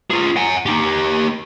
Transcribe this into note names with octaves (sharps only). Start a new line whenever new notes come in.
F4 G#4
F#5 G#5
D#4 G4